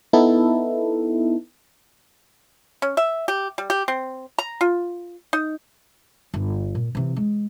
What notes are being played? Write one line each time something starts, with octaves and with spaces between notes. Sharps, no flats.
B3 D#4 E4 A4
C#4
E5
G4
G3
G4
C4
A#5
F4
D#4
G1
A#2
C3 E3
G#3